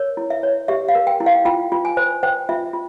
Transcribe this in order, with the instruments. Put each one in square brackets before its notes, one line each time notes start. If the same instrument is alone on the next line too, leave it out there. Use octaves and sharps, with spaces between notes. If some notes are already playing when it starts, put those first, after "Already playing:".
Already playing: [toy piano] A#4 C#5
E4
E5
C#5
G4 E5
F5
A#4
G5
E4
F5
F4 G5
F4
G#5
C5
C5 G5
F4 E5
F4